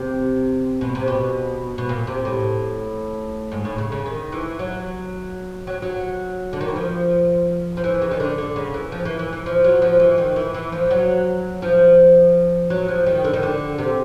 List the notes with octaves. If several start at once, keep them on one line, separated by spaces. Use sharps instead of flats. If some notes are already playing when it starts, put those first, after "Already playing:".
Already playing: C3
B2
C3
B2
B2
A#2
C3
A2
G#2
A2
C#3
C#3
D#3
E3
F#3
F#3
F#3
D3
D#3
E3
F3
F3
E3
C#3
D#3
D3
D3
C#3
E3
F3
E3
E3
E3
F3
F#3
F3
E3
D#3
E3
E3
F3
F#3
F3
F#3
F3
D#3
D3
D#3
D3
C3